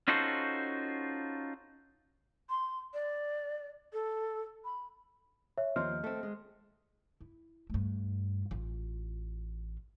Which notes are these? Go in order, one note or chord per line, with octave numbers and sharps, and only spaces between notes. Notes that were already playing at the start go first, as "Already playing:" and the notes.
C#4 D#4 F4 F#4 A4 C5
C6
D5
A4
B5
C#5 E5
D#2 F3 C4 D#5 C6 F6
A3 C4
G#3
E4
G2 A3
A1 F4